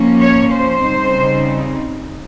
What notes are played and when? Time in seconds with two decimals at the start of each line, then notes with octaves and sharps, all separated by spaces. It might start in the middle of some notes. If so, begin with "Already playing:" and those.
Already playing: F3 A#3 C#4
0.21 C#5
0.53 C5
0.86 C#3 G3 C4 D#4